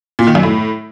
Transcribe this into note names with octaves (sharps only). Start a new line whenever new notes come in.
A#2
D#3
F#2
A2